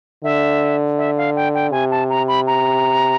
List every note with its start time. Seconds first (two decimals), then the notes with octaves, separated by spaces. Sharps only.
0.24 D3 E5
0.98 E5
1.17 F5
1.36 G5
1.54 G5
1.72 C3 G#5
1.91 A5
2.10 A#5
2.28 B5
2.47 A#5